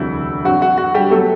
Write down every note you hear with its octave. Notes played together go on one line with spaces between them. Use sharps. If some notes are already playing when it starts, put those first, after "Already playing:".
Already playing: E1 D2 C3 F#3 E4
G2 F#3 C4 F#4
F#4
F#4
G3 G4
F#3 A3 B3 A4